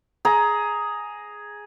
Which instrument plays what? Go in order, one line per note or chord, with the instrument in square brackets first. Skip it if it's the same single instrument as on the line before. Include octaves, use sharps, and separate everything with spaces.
[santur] G#4 A#5